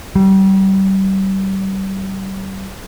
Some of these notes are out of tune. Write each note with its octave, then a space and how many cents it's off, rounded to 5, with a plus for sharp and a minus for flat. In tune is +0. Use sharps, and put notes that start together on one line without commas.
G3 -30